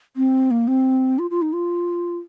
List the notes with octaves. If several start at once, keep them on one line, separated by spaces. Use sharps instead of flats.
C4
A#3
C4
F4
F4
D#4
F4